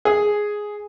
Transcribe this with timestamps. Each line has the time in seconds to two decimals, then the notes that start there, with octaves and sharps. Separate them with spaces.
0.05 G#4